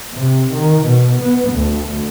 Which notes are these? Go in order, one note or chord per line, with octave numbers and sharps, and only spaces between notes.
C3
D#3
B2
B3
D2